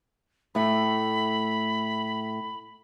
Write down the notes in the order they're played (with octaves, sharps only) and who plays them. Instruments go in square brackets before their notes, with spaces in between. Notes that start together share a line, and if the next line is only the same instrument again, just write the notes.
[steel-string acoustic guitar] A2 A3 [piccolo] B5